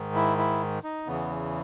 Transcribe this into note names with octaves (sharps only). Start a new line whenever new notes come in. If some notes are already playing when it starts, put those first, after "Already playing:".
Already playing: G#2 D#3
E4
E4
D#4
E2 C#3 E3 B3